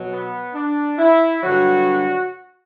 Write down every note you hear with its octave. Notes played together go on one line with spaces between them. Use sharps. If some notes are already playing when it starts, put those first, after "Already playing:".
Already playing: B2 F#3
B3
D4
E4
G2 D3 F#3 F#4